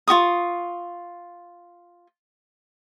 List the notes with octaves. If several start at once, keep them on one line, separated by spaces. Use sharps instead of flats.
F4 F#4 C#6 D#6